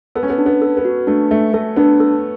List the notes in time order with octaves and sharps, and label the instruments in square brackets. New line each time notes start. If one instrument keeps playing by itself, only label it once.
[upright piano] B3 [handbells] A4
[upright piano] C#4
B3
[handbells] D4
[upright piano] B3
[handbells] A4
[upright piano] B3
[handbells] F#4
[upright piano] A3 [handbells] D4
[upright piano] A3 [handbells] E5
[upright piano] A3 [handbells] A4
[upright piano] B3 [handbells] D4
[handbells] A4